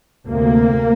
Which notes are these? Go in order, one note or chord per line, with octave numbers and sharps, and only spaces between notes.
D2 C3 A#3